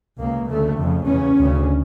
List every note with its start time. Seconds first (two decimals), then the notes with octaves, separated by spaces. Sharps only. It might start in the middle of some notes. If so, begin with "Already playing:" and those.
0.19 C#2 C#3 A#3
0.49 D2 C#3 A3
0.78 F2 C#3
1.07 E2 C#3 C#4
1.38 D2 C#3